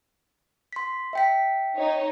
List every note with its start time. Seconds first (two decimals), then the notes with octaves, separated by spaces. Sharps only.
0.73 C6 B6
1.13 E5 G5 B6
1.76 D#4 C#5